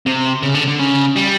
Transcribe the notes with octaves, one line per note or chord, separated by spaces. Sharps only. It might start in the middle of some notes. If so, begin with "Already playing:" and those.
C3
C#3
D3
D3
C#3
G3